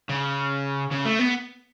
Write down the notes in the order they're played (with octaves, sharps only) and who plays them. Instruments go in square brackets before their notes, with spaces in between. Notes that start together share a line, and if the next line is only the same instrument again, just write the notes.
[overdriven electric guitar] C#3
C#3
A3
B3